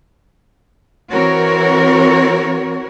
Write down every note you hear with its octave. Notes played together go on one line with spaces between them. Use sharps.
E3 C4 F#4 A#4 C#5